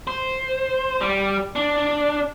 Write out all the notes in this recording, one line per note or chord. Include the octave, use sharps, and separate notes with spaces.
C5
G3
D4